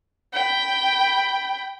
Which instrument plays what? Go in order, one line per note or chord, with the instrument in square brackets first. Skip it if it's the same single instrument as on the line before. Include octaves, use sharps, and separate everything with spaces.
[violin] G5 B5